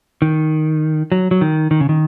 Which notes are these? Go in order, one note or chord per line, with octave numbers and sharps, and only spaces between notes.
D#3
F#3
F#3
D#3
D#3
C#3
D#3